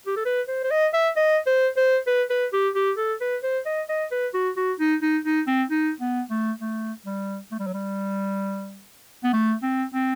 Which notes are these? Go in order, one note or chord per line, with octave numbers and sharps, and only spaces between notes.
G4
A4
B4
C5
C5
D#5
E5
D#5
C5
C5
B4
B4
G4
G4
A4
B4
C5
D#5
D#5
B4
F#4
F#4
D#4
D#4
D#4
C4
D#4
B3
A3
A3
G3
A3
G3
F#3
G3
B3
A3
C4
C4